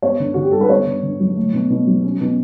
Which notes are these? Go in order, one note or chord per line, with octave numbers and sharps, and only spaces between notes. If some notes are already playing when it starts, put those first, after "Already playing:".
B3 C#5
D3
D3 F#4
G4
G3 A4
B4
B3 C#5
D3
D3
F#3
A3
B2
B2
F#3
C#4
B2